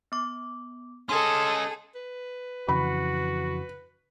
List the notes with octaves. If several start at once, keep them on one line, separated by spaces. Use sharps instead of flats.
B3 D6
C#4 G#4 A4 D#5 C6
B4
F2 C#3 E3 F#4 B5